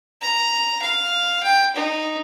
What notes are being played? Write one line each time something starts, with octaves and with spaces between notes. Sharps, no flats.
A#5
F5
G5
D#4